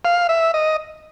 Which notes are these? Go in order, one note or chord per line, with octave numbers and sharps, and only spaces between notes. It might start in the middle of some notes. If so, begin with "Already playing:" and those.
F5
E5
D#5